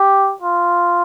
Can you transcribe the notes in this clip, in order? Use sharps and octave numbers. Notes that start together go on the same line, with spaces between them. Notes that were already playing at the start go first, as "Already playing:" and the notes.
Already playing: G4
F4